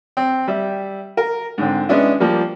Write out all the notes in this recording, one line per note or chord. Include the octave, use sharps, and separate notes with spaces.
C4
G3 E5
A#4
G#2 D3 C4
G#3 B3 C#4 D4 E4
F3 G3 A#3